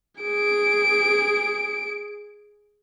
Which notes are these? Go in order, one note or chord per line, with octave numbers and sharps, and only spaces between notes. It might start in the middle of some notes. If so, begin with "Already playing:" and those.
G#4 D7